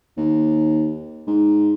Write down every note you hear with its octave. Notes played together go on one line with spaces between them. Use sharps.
D#2
G#2